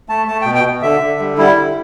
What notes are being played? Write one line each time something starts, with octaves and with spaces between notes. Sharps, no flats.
A3 A5
A3 A5
B2 G5
G5
B2
D3 E5
D3
G3
G3 E4
D3